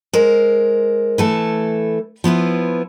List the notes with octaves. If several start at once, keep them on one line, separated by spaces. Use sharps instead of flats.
G#3 A#4 C5
E3 A3 A4
F3 B3 E4 F4